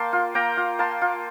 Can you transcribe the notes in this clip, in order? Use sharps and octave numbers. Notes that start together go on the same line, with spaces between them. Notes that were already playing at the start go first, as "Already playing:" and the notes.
Already playing: A#3 G5 A5 C6
F4
A#3 G5 A#5
F4
A#3 A5 C6
F4